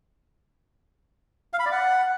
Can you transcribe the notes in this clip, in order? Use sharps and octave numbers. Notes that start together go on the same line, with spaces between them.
F5
B5
D5
F#5